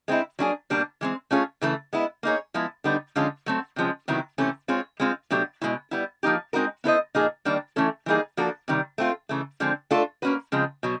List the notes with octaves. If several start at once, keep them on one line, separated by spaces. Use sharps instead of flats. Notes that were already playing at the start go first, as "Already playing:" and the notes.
G#3 C4 E4
F#3 A#3 D4 F4 G#4
B2 G3 A#3 D4
E3 G#3 C4
A3 C#4 F4 G#4 C#5
C#3 E3 A3
G#3 B3 E4
A#3 D#4 G#4 C#5
F3 G#3 B3 E4
D3 G3 B3 D#4
D3 F3 G#3 C#4 F4
F#3 A3 C4
C3 F3 G#3 C#4
C3 D#3 F#3 B3 E4
C3 E3 A3 C#4
G#3 C4 F4 G#4 C#5
G#3 C4 F4
B2 F#3 A3 D4 G4
B2 G#3 C#4 E4
G3 B3 E4
F3 A#3 D#4 G4
G#3 C4 D#4 F#4 A#4
B3 E4 A4 C5 D#5
A#2 F3 A#3 D#4 G#4
D#3 G3 A#3 D4
E3 A3 C#4 E4 A4
E3 G3 A#3 D#4 G#4
F3 A#3 D4 F#4 A4
C3 D#3 G3
A3 C4 F4
C#3 E3 A3
D3 F3 G#3 C4
A3 D4 F4 A4
A#3 C#4 F#4 B4
C#3 F3 G#3 C4
B2 F#3